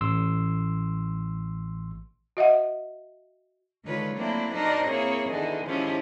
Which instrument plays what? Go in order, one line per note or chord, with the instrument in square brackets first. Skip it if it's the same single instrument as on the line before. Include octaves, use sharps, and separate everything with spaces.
[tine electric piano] A1 C6 E6
[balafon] F#4 D#5 E5 F#5
[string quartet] D3 D#3 G#3 F4 B4 C#5
F#3 A3 A#3 C4 D4 E4
D4 D#4 F#4 A#4 C5 D5
A#3 C4 E4 G#4 C#5
E2 D3 D#3 D#5
D#3 F3 G#3 C#4 E4 G4